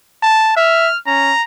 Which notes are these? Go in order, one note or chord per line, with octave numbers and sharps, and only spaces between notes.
A5
E5 F6
C#4 A#5